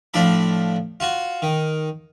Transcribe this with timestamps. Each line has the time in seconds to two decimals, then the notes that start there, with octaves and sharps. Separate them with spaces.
0.14 A2 F3 D4 D5 B5
1.00 F4 F#4
1.42 D#3